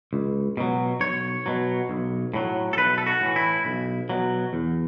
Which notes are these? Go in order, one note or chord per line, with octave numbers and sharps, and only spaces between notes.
C#2
B2 F#3
B1 C#5
B2 F#3
B1
A2 F#3
A4
B1 B4
A4
F#4
A2 E3
E4
B1
B2 F#3
E2